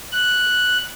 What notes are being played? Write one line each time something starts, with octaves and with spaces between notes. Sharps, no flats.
F#6